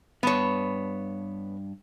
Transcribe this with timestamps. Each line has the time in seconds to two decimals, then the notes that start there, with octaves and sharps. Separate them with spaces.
0.23 G2 B3 C#5 A5